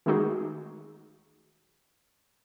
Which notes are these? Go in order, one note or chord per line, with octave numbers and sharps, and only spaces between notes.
D#3 G#3 A3 D#4 F#4 G#4